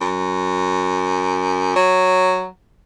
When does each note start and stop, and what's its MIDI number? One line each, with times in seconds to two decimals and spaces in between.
0.01 1.75 42
1.76 2.47 54